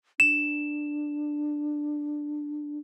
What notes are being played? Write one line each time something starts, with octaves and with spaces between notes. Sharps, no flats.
D4 E7